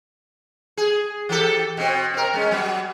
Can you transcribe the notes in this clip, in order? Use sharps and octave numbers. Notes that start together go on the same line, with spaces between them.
G#4
E3 G4 A4
B2 C4
C4 A#4
G#3 C#4
F#3 B3